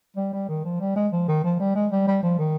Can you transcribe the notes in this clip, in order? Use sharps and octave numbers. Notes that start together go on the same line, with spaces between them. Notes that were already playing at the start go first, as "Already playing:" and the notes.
G3
G3
D#3
F3
G3
G#3
F3
D#3
F3
G3
G#3
G3
G3
F3
D#3